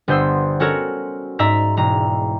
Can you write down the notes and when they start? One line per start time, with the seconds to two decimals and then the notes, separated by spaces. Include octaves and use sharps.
0.08 G1 B3 C5 C6 E6
0.60 C#4 F#4 A4 A#4 C#5
1.39 G#2 D5 E5 A#5 E6 B6
1.77 E1 A#5